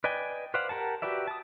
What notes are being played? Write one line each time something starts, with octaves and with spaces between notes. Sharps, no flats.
B4 D5 D#5 G5 G#5
B4 C5 D5 F5 F#5
G4 A#4 F#5 A5
F#4 G4 B4 D5 E5
A5 D#6